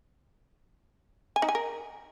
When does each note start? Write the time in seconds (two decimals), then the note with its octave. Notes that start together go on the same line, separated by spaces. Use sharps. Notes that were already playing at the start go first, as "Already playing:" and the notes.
1.36 G#5
1.42 D#4
1.49 G#5
1.55 A#4